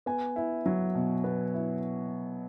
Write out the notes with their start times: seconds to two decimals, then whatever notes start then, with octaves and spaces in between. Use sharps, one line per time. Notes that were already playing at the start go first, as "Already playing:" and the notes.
0.06 B3 G#5
0.36 E4
0.66 F#3
0.95 B2
1.24 B3
1.54 E4